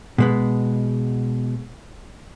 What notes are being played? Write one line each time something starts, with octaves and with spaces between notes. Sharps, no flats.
B2 G#3 B3